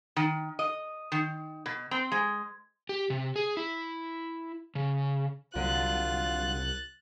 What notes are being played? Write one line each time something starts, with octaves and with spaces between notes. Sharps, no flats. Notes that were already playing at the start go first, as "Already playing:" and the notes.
D#3
D#5
D#3
B2
C4
G#3
G4
C3
G#4
E4
C#3
C2 D3 F#3 F4 F#6 A6